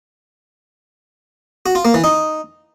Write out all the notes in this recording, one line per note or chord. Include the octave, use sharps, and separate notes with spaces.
F#4
F4
A#3
E3
D#4